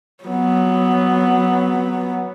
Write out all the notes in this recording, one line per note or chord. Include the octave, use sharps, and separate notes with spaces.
F#3 B3